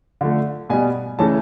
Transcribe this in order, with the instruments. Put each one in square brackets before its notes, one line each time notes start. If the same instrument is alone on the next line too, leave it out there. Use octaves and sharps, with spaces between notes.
[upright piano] D3 F3 A3
B2 G3 B3 G#5
C#3 E3 A3 C#4 A5